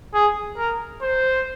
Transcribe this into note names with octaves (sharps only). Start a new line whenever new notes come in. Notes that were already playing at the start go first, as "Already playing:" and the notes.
G#4
A#4
C5